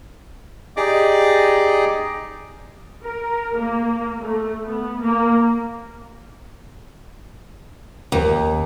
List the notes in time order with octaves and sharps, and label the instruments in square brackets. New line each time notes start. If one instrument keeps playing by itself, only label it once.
[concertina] D#4 G4 G#4 D5 D#5 D6
[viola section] A#4
A#3
A3
B3
A#3
[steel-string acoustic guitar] D#2